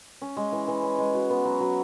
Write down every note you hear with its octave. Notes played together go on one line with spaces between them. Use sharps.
C#4
G#3
E3
E3
C#4
G#3
F#4
B3
F#3
F#3